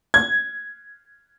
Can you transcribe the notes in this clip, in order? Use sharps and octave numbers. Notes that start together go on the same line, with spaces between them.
G#6